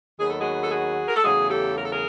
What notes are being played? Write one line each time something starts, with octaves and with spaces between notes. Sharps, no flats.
D#2 D#3 F#3 B3 G#4
A4
F#4 G#4
A4
F#4 G#4
A#4
A4
E2 C#3 F#3 A3 F#4 G#4
G4 A4
A#4
A4
G#4 A#4